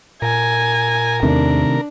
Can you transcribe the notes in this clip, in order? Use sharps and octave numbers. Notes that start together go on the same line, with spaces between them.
A#2 A#4 G#5
E2 C3 D#3 A3 D4